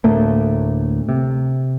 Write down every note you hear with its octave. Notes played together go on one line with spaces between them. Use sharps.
D2 A2 A3 A#3
C3